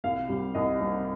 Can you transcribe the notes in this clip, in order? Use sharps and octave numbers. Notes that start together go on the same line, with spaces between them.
C2 F5
C3 G3
C2 D#5
C3 G3